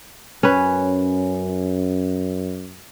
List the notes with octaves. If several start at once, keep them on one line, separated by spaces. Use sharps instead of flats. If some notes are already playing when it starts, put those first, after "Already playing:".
F#2 C#4 B4